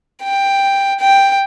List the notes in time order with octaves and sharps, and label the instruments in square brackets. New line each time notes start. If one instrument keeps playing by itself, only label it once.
[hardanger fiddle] G5
G5